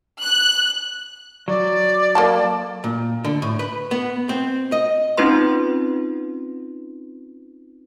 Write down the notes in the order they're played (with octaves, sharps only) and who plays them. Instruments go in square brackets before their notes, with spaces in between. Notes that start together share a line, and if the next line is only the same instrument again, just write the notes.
[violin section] F#6
[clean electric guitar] F#3 [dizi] D5
[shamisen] A#3 A4 A5
[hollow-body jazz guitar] A#2
D3
A2
B4
B3
C4
D#5
[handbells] C4 C#4 D#4 F4 B4 C6